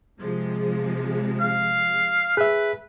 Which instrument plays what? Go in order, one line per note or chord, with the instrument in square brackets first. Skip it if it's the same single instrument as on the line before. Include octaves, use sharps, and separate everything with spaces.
[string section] C3 F3 G#3
[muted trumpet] F5
[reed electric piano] G#4 E5 [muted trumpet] B4